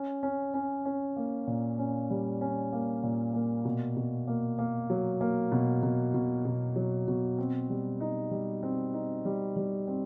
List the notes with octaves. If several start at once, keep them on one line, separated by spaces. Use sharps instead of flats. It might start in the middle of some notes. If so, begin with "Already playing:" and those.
Already playing: C#4
C#4
C#4
C#4
A#3
A#2
C#4
G3
C#4
A#3
A#2
A#3
B2
B2
A#3
A#3
F#3
A#3
B2
B2
B2
B2
F#3
B2
C4
G3
D#4
G3
C4
D#4
G3
G3
C4